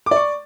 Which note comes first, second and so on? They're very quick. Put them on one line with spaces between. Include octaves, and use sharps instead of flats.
D6 D5 C#6